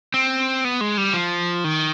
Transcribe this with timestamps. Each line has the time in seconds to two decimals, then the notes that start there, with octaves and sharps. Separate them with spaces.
0.14 C4
0.65 B3
0.81 G#3
0.97 G3
1.14 F3
1.64 D#3